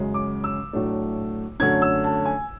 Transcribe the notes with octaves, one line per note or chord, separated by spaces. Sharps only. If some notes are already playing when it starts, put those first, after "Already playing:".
Already playing: F#2 C#3 G#3
D6
E6
A2 F#3 A3 D4
F#2 D3 A3 C#4 G#6
E6
A5
G#5